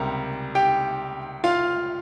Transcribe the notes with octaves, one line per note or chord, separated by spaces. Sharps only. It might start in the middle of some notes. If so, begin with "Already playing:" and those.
Already playing: C#2 C3 G3 A#4
G4 G5
F4 F5